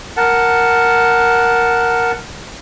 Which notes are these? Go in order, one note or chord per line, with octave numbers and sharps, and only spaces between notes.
A#4 F#5 A5